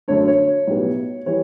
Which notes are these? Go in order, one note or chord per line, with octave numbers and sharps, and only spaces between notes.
F#2 D3 A3 D4 C#5
C#5
B1 A2 G3 B3
E3 G3 C#5